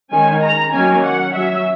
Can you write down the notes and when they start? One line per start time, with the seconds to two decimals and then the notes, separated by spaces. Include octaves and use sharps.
0.11 D#3 G#3 C#4 G#5
0.42 A#5
0.72 D#3 F#3 A#3 C#4 G#5
1.03 F#5
1.34 F#3 C#4 E5